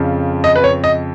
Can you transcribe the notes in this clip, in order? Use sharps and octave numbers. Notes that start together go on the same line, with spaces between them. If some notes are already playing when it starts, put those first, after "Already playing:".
Already playing: F2 C#3 F3
D#5
B4
C#5
D#5